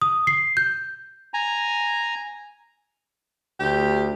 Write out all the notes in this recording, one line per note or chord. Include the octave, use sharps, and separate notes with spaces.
D#6
C7
G6
G#5 A#5
D2 G4